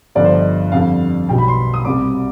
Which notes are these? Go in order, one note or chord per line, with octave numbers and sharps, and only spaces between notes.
G1 G2 D3 F3 D5
C5
D#5
F2 D3 G3 F5
B1 B2 G3 G5
B5
C6
D#6
C2 C3 G3 D6